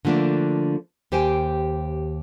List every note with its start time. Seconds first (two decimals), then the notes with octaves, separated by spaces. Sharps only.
0.05 D3 F3 A3 A#3 D4
1.12 D#2 G4 C5 G5 G#5